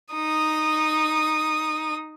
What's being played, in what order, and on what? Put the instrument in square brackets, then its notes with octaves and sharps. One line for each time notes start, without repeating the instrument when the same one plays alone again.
[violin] D#4 D#6